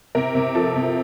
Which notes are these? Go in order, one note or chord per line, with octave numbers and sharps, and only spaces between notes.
C3 A#4
C3
F3 A4
C3